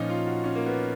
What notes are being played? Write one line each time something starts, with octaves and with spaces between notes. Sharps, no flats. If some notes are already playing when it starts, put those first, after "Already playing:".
Already playing: A#2 F3 C#4 D#4
F4
F#4
C#4
A#3
B3